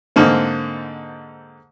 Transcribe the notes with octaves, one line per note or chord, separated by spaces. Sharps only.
G#2 D3 A#3 C4